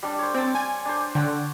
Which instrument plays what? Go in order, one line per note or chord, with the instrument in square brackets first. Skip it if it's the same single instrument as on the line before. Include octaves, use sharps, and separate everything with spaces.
[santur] G3 D4
C5 C#5
[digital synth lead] C4 [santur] G5 A5
[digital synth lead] G#5
[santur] D4 C5
[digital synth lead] D3 [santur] C#5 F#5 G5